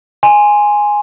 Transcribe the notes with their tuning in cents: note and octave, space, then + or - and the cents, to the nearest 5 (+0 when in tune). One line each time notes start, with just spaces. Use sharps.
G#5 +0 C6 +0